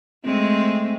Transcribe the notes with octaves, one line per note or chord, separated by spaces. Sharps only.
G#3 A3 C4